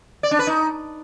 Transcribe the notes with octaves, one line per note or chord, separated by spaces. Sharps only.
D5
D4
B4
D#4